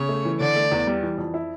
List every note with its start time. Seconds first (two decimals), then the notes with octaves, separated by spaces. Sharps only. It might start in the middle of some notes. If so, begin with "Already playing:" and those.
Already playing: C#3 C#5
0.09 A3
0.25 E3
0.40 D3 D5
0.56 A3
0.72 E2
0.87 G3
1.03 E3
1.18 F2
1.34 E4